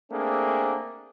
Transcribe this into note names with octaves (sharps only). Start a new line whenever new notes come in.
A3 A#3 C4 D4 G#4